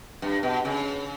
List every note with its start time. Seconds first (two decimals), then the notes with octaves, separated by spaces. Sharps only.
0.22 G2
0.43 B2
0.65 C#3